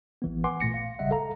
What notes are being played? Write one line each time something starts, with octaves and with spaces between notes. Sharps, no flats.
A1 E3 B3
B4 F#5 G#5 C6 D6
A#2 A3 A#6 C#7
F5
G#1 C#3 G3 D#5 E5 F#5
A4 F5 A#5